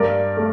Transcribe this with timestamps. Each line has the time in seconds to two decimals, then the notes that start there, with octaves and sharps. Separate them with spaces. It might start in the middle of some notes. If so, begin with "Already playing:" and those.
Already playing: G2 A#4 D5
0.37 A3